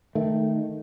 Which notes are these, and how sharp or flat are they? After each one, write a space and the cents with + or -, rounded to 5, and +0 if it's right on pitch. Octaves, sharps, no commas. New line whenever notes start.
D#3 +0 A3 +0